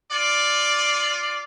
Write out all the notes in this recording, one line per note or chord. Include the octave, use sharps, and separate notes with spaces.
F4 D5